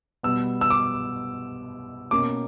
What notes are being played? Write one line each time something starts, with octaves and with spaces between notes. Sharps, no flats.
B2 G3 B3 E6
E6
D6
B2 A#3 C#4 D6